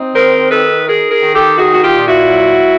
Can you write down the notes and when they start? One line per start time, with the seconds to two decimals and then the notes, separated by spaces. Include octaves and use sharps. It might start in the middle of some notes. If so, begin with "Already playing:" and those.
Already playing: C4 D#4
0.14 D#3 A#4 C5
0.50 D#4 A4 B4
0.86 D#4 G#4 A#4
1.10 G#4 A#4
1.23 D#3
1.34 G4 A4
1.58 D#4 F#4 G#4
1.73 F#4
1.82 F4 G4
1.95 A#2
2.07 E4 F#4
2.31 F#3